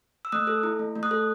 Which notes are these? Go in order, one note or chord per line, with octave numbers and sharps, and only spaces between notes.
E6
A3 D#6 F#6
A4
E4
A3
A3
D#6 F#6
A4